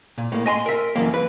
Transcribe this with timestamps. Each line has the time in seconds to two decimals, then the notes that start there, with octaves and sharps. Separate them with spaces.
0.18 A#2
0.32 A2 A#3
0.46 D#5 G#5 B5 C6
0.66 A#4 E5
0.96 F#2 C#3 E3 A#3
1.14 B4